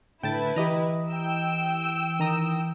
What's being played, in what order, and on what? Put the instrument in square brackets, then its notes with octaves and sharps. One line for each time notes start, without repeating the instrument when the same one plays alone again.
[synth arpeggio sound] A2 D3 [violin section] E4 B4 [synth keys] G5 A5 A6
[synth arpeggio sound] E3 [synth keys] G4 D#5 A#5
[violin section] G5 E6
[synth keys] D#3 A#5 D#6